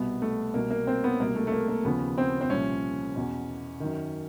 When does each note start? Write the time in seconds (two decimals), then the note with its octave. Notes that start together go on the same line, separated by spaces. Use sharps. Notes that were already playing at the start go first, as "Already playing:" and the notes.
Already playing: C2 B2 B3
0.22 A3
0.54 C2 B2 A#3
0.71 A#3
0.87 C4
1.04 B3
1.20 C2 B2 A#3
1.36 A3
1.47 A3
1.52 A#3
1.68 A#3
1.85 D#2 C#3 F3 B3
2.18 C4
2.41 C4
2.50 C2 A#2 F3 C#4
3.16 E2 B2
3.80 F#2 D#3